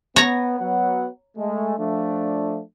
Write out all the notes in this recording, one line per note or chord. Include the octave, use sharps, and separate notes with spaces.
B3 C#5 A#5
F#3 B3 F#5
G#3 A3
F3 A3 D4